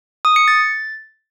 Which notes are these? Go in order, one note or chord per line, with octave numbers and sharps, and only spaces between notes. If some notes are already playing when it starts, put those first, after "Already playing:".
D#6
C#7
A6